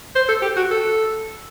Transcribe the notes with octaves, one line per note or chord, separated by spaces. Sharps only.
C5
A4
G4
F#4
A4